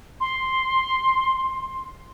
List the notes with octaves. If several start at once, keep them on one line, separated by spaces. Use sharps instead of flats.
C6